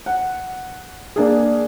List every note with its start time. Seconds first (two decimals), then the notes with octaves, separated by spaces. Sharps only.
0.06 F#5
1.16 A#3 D4 G#4